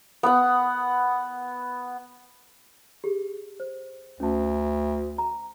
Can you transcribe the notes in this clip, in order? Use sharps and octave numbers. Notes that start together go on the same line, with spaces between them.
B3 F#5
G4 G#4
C5
D2 C#4 A5
A#5